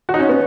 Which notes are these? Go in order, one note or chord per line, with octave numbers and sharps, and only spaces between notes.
F#4
D#4
C#4
B3